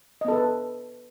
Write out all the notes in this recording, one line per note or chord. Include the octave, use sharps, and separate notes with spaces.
B3 A4 B4 D#5